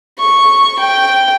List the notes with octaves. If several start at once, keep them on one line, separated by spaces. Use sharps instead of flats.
C#6
G5